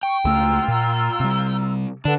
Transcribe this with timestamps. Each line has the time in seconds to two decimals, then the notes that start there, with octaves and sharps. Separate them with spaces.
0.03 G5 C#6
0.25 C#2 A3 F4 A#5 E6
0.68 A#2
1.20 C3 G3
2.05 D3 D4 A4 B4 F#5